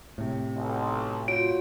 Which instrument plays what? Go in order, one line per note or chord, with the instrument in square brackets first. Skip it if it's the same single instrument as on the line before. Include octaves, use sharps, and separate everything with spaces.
[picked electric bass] A2 C3
[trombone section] B1
[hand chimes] F4 F#4 C#5 [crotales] D7